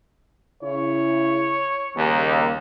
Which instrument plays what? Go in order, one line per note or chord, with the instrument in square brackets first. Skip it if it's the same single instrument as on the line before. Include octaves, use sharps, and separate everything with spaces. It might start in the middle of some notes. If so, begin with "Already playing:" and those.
[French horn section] C#3 E4 [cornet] C#5
[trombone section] D#2 [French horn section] C#3 G3 A#3